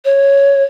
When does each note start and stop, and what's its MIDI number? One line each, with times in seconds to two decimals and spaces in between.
0.05 0.64 73